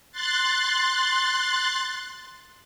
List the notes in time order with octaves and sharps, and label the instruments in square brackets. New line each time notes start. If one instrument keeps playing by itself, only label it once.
[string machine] C6 F#6 A6